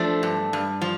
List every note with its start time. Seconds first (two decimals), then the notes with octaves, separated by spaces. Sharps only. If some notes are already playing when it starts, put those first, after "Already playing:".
Already playing: F3 A3 D4
0.23 G2
0.53 G2
0.81 F3